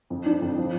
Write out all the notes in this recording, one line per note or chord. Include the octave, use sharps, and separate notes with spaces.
F2
D4
F2
F3